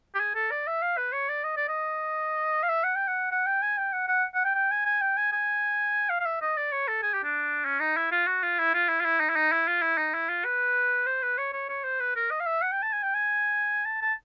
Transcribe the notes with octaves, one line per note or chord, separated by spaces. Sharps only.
G4
G#4
A4
D5
E5
F5
B4
C#5
D5
D#5
D5
D#5
F5
E5
F#5
G5
F#5
F#5
G5
G#5
G5
F#5
F#5
F#5
G5
G5
G#5
G#5
G5
G#5
G#5
F5
F5
E5
D#5
D5
C#5
A4
G#4
G4
D4
C#4
D#4
E4
F4
F#4
F4
E4
F4
E4
F4
E4
D#4
E4
D#4
E4
F4
E4
D#4
E4
F4
B4
C5
B4
C#5
C#5
C#5
C5
B4
A#4
D#5
F5
E5
F#5
G5
A5
G#5
G5
G#5
A5
A5